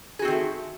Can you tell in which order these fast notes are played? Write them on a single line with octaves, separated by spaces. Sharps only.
G#4 F#4 C4 D#3 A3